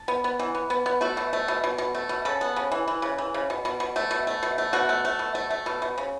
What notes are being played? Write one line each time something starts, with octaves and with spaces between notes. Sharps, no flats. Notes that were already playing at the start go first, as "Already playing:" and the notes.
Already playing: A5
B3
B3
E3
B3
B3
B3
A3 F#4
B2
A3
B2
B2
B2
A3
B2
C#3 A4
B3
C#3
E3
E3
C#3
E3
C#3
B2
B2
B2
A3
B2
A3
B2
A3
B2 F#4
A3
A3
B2
A3
A3
B2
B2
C#3